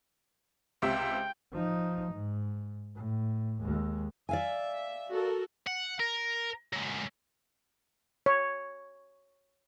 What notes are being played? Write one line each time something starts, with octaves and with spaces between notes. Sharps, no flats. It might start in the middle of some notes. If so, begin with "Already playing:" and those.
C#2 C3 E5 G5
F3 D#4
G#2
A2
D#2 G#3
D5 E5 F5 G#5
F#4 A4 A#4
F#5
A#4
F#3 G#3
C#5